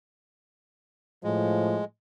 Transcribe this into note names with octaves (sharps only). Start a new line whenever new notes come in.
A2 F3 G#3